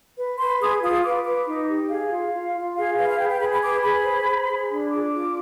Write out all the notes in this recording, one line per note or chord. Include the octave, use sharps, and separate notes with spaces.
B4
B4 C6
G#4 D#6
F4 D#6
B4 D6
B4 D6
D#4
G4
G#4 F5
F4 F5
F4
F4
G#4 F5
B4 F5
F5
B4 G5
G5
G#4 B5
B5
B4 D6
G#4 B5
C5
C5
G#4
D4
F4 D6
F4